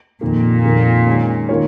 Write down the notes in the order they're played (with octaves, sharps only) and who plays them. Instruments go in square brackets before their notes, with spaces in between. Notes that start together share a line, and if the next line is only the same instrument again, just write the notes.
[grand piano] F2 D#3 A#3 [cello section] A#2
[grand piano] F2 D#3 A#3
D#3 G#3 C#4
D#3 A#3 F4 A#4 C#5